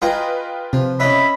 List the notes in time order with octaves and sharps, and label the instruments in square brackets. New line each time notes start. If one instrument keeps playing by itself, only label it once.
[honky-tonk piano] F4 B4 G5 [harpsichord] G#4 D#5 A#5
[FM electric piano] C3 [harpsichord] F3
[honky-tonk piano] C#4 E5 [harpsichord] C#5 D#5 [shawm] B5